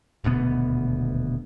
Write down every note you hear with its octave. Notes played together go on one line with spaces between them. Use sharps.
D#1 D2 B2 B3